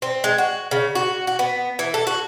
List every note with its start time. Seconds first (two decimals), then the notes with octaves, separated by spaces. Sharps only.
0.02 C4
0.24 G#3
0.38 F#4
0.71 C#3
0.95 F#4
1.27 F#4
1.39 B3
1.79 E3
1.94 A4
2.07 F#4